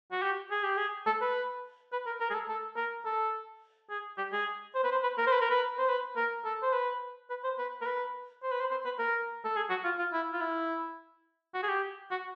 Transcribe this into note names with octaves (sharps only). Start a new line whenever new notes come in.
F#4
G4
G#4
G4
G#4
A4
B4
B4
A#4
A#4
G#4
A4
A4
A#4
A4
G#4
G4
G#4
C5
B4
C5
B4
A#4
C5
B4
A#4
B4
C5
B4
A#4
A4
C5
B4
B4
C5
B4
A#4
B4
C5
B4
C5
C5
B4
A#4
A4
G#4
F#4
F4
F4
E4
F4
E4
F#4
G#4
G4
F#4